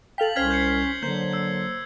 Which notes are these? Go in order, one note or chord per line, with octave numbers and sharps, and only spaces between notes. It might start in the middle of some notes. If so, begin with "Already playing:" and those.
A4 F5 G5 B6 F#7
C2 C#4 C5 F6 G#6 B6 G7
G6 C7 C#7
D3 F#3 A#3 C5 G6
E6 G6 C7